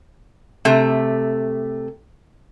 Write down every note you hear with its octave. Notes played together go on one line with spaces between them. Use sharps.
C3 A3